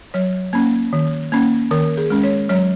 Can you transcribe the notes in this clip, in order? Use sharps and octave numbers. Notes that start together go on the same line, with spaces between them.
F#3 C#5
A#3 C#4
D#3
A#3 C#4
D#3 A#4
G#4
G#3 C#4
C#5
F#3 C#5